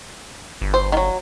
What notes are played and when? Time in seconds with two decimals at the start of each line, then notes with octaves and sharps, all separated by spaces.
0.62 G1
0.74 C5
0.92 D#3 F#3